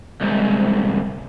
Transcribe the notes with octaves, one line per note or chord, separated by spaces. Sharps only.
C2 G#2